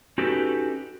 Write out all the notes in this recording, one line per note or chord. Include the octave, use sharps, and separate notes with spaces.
C#4 D#4 F#4 G4 A4 B4